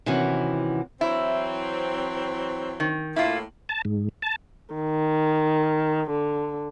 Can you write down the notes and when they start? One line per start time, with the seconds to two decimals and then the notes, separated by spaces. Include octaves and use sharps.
0.06 C3 D#3 E3 B3 C#4 F#4
1.01 E3 F#3 C4 E4
2.80 D#3
3.16 A2 A#3 E4 F4
3.69 A5
3.85 G#2
4.22 A5
4.74 D#3
6.10 D3